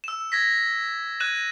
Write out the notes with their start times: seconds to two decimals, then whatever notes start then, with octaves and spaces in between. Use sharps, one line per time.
0.04 E6 E7
0.32 G#6 A#6 B6
1.20 F#6 G#6 D#7 E7 F#7